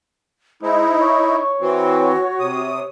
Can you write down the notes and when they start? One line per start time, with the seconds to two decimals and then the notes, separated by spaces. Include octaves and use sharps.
0.62 G#3 D#4 E4 C5
1.00 C#5 C#6
1.61 E3 C4 F#4
2.39 C3 D#6